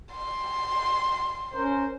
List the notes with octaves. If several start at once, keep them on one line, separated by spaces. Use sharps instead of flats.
C6
C#4 A#4 C5